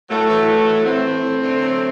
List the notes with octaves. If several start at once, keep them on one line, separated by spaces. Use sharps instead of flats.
A2 F#3 A3
E3
A2
E3
A2 A3 C4
E3
A2
D3
F#3